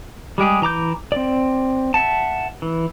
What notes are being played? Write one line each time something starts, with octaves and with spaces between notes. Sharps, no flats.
G3 G#3 G4 G#4
E3 A#5 D6 G6
C4 D5
E5 F#5 A5
E3